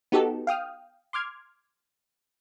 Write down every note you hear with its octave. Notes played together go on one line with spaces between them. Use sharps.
B3 D#4 F#4 G4 A4
F5 G5 D#6 F6
C6 D6 F6 G#6